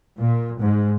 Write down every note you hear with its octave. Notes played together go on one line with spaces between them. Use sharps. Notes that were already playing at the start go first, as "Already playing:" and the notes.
A#2
G#2